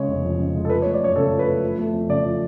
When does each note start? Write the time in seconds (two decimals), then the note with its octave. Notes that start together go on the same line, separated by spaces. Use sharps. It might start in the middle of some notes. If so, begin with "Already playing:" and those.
Already playing: C#3 G#3 C#5
0.08 F1
0.23 F2
0.39 C#3
0.54 G#3
0.65 A4
0.69 F3 B4
0.82 C#5
0.85 A3
0.94 D5
1.00 F#2 C#5
1.16 C#3 A4
1.32 F3
1.39 B4
1.48 A3
1.62 F3
1.79 A3
1.94 F2
2.09 C#3 D5
2.24 F3